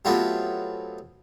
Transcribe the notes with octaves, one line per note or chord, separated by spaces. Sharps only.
F#3 A3 B3 C4 F4 G4